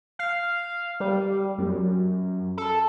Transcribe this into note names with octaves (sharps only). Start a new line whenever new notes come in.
F5
G3
F#2
A4